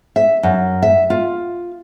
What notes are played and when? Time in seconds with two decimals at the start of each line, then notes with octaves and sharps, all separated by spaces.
0.16 E5
0.43 F#2
0.82 E5
1.10 F4